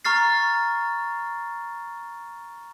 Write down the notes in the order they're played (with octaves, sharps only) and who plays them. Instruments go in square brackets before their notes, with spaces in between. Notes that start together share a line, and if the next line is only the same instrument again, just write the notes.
[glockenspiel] A#5 C#6 F6 A6 C7